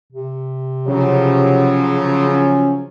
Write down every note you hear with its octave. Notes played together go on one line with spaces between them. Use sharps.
C3
C#3 F3 F#3
C#4